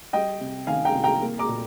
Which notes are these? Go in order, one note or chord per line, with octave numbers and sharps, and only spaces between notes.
G3 D#5 G5
C3
D#3 F5 G#5
G5 A#5
C2
G5 A#5
A#3
A#5 D6
A#2